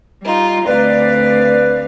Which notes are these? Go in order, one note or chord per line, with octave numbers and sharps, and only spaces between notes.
G3 D#4 F4
D2 C4 B4 D5 F5